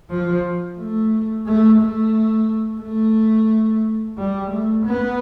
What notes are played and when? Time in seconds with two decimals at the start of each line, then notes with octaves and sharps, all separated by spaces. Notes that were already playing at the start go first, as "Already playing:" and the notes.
0.11 F3
0.79 A3
1.46 A3
1.81 A3
2.81 A3
4.18 G3
4.51 A3
4.86 B3